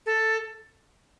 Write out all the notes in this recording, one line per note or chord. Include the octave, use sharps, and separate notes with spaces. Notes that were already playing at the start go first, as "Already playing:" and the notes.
A4